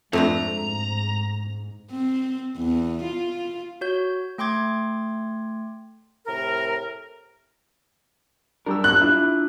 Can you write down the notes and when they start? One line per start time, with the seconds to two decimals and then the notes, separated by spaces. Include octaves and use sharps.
0.13 F2 G#2 A3 C4 D4 A#5
1.91 C4
2.57 E2
3.03 F4
3.81 F#4 C#5 G6
4.38 A3 G5 C6 D6 G#6
6.27 A2 C3 A#4
8.66 F#2 G3 D4 G4 A#4 E6
8.84 F#6
9.01 D4 E4 F4 E5